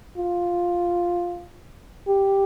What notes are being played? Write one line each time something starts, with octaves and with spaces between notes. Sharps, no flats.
F4
G4